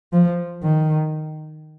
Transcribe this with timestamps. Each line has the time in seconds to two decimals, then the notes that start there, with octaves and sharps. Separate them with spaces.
0.13 F3
0.63 D#3